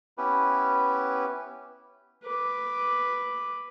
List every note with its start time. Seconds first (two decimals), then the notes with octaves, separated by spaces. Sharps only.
0.18 B3 C#4 E4 G4 B4
2.24 B4 D6